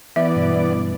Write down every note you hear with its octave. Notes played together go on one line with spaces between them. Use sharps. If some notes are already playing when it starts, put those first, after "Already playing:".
E3 B3 D5 E5
G2 B2